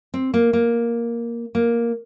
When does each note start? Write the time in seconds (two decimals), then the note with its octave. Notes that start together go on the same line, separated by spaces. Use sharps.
0.14 C4
0.34 A#3
0.53 A#3
1.55 A#3